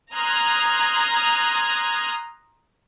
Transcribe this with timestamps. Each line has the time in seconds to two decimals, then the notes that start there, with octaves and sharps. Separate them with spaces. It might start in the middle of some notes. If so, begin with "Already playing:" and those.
0.14 A#5 C6 D#6 F6 F#6 G#6